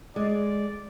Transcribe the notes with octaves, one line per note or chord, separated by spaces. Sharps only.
G#3 D5